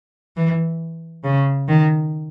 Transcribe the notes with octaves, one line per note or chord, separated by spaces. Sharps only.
E3
C#3
D#3